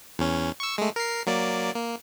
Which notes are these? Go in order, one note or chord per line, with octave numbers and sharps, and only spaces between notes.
E2 C#4
C#6 E6
G#3 A3
A#4 C7
F#3 A#3 D5
A#3